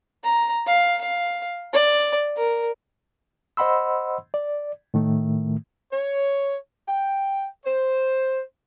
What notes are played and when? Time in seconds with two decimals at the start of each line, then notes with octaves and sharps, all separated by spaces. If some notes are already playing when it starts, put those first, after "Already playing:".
0.24 A#5
0.67 F5
1.01 F5
1.73 D5
2.37 A#4
3.57 C5 D#5 F#5 B5 C6 E6
4.34 D5
4.94 A2 D#3 A3
5.92 C#5
6.87 G5
7.65 C5